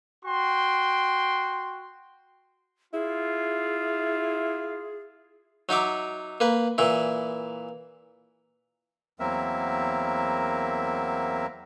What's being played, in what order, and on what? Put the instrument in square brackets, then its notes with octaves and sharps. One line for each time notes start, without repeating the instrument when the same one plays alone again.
[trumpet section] F#4 G5 C6
[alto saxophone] E4 [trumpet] F4 [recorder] G#4
[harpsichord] F#3 D#4 E5 D6
A#3 B4
A#2 E3 E4
[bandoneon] E2 F#3 A#3 C4 A#4 E5